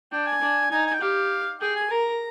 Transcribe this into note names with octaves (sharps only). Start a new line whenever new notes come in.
D4 G5
G#5
D4
D#4 G#5
G#5
G5
G4 F5
G#4 G5
G#5
A#4 A#5